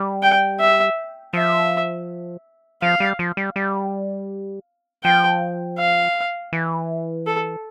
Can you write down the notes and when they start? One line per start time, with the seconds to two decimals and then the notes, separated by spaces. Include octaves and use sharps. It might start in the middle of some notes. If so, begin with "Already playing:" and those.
Already playing: G3
0.23 G5
0.60 E5
1.33 F3 E5
2.82 F3 F5
3.00 G3
3.19 F3
3.37 G3
3.56 G3
5.04 F3 G5
5.78 F5
6.53 E3
7.26 A4